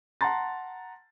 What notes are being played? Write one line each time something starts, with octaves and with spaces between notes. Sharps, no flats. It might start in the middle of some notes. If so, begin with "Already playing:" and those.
F#5 A5 A#5 C6 A6